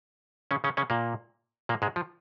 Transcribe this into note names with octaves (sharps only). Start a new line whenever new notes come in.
C#3 C#4
C#3 C#4
C#3 C#4
A#2 A#3
A#2 A#3
G#2 G#3
F3